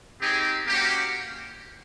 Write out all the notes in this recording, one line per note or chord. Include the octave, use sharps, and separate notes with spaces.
C4 D#4 G4 G#4
A#3 C#4 F#4 G4